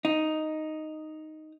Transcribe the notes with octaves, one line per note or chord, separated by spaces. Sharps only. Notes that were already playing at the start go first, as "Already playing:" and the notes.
D#4